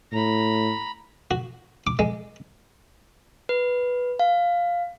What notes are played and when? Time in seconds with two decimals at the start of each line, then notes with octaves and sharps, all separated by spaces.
0.12 A2 A#5 B5
1.31 F#4
1.87 D6
1.99 G#3
3.49 B4
4.19 F5